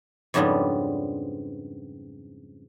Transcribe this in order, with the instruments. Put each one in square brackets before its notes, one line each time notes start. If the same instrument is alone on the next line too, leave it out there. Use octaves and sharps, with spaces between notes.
[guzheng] F2 G#2 C#3 G3 B3 D4